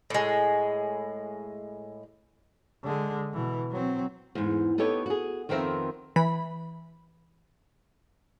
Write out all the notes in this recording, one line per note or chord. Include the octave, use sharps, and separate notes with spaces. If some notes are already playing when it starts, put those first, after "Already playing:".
A2 G#3
D3 G#3
B2 E3
F#3 C4
E2 G#2
B3 D#4 G4 A4 C#5
F#4 G#4
F2 D#3 B3 C4 A#4 E5
E3 B5